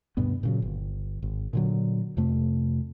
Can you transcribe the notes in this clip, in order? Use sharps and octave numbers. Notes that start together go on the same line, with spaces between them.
D2 G2 B2 B3
A#2 C#3 F#3
G1
G#1
A#2 D3 F#3
F2 C3 A3